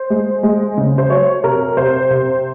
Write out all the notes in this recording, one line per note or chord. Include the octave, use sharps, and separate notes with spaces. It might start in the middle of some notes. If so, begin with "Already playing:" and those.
Already playing: C5
G#3
G#3
C#3
C5
F#3 C#5
C3 A#4
C3 C5
C3